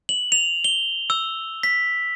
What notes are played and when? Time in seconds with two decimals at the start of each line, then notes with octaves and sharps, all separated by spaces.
0.09 F#7
0.32 F7
0.64 G7
1.10 E6
1.63 B6